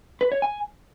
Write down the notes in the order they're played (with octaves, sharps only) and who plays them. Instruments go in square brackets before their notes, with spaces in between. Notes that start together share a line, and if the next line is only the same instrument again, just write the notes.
[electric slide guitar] B4
C#5
G#5